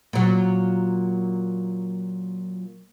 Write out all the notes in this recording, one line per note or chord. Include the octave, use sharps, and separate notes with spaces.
A#2 F#3